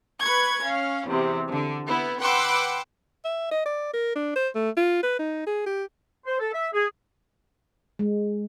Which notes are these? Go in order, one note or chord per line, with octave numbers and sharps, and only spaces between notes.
B4 C#6 G#6
C#4 F5
E2 C3
D3
B3 E4
B4 F#5 G5 C6 D6 E6
E5
D#5
D5
A#4
D4
C5
A3
F4
B4
D#4
G#4
G4
C5
A4
E5
G#4
G#3